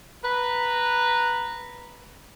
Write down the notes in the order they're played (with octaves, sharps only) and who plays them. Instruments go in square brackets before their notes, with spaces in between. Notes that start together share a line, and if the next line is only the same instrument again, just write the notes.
[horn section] B4 A#5